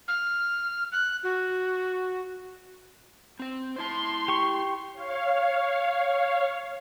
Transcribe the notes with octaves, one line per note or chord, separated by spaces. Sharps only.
F6
F#6
F#4
C4 C5
E4 A5 C6
G4 C#6
C#5 F5